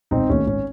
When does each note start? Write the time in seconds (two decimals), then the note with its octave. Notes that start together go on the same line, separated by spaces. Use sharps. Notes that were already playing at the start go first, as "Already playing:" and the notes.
0.11 E1 C4 D#4
0.29 D#2 D#3 A3 C#4
0.47 G#1 C#4